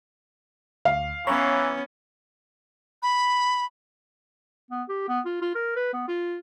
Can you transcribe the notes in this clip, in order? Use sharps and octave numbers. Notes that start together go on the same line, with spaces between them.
D2 F5
E3 B3 C#4 C#5 A#5 B5
B5
B3
G4
B3
F4
F4
A#4
B4
B3
F4